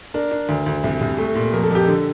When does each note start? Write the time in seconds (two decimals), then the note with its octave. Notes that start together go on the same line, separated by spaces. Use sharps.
0.14 D4 A#4
0.32 D4
0.49 D2
0.66 D2
0.84 C2
1.01 C2
1.18 A3
1.35 A#2
1.53 F2 A#4
1.63 A4
1.71 F2 G4
1.85 D3 A4